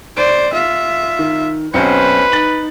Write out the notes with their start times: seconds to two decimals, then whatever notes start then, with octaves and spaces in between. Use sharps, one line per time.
0.17 C5 D5 D7
0.53 F4 E5
1.19 D#3
1.74 B1 C4 C#4 B4 C5 C#7
2.32 D#4 A6 F#7